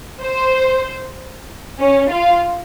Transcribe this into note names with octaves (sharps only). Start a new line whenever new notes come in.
C5
C#4 C#5
F4 F5